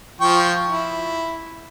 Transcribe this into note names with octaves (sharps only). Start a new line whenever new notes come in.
F3 G5 C#6
E4